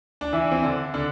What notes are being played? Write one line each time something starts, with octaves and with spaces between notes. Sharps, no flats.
D4
E3 E4
C4
D3 D4
D3 D4